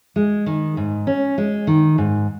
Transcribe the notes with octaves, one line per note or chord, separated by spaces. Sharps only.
G#3
D#3
G#2
C#4
G#3
D#3
G#2